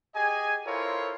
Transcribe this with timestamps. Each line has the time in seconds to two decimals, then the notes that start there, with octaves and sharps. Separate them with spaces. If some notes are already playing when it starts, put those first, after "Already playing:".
0.15 G4 G#4 D#5 G#5
0.65 E4 F4 A4 A#4 C5 C#5